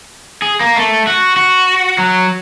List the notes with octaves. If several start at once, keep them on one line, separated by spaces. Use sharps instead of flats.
G#4
A#3
A3
F#4
F#4
F#3